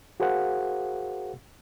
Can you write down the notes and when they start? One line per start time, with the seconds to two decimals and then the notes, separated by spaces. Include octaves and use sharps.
0.20 F#4 G#4 A#4 C5 F5 F#5